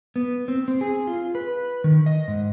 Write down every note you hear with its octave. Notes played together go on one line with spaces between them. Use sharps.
B3
C4
C4
G#4
F4
B4
D#3
D#5
G#2